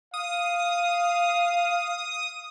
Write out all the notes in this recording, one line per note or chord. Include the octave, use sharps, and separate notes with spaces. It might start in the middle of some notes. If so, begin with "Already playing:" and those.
F5 D#6